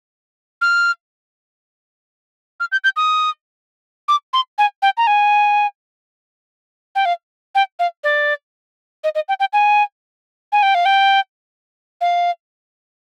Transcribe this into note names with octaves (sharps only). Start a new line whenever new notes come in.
F6
F6
G6
G6
D#6
D6
C6
G#5
G5
A#5
G#5
G5
F5
G5
F5
D5
D#5
D#5
G5
G5
G#5
G#5
G5
F5
G5
F5